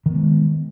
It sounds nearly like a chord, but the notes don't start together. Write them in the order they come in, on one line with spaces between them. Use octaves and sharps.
D#3 B3 G#3